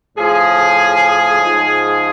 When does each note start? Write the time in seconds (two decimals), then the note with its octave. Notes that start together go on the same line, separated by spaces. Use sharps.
0.18 A2 F3 G#4
1.42 G#2 F3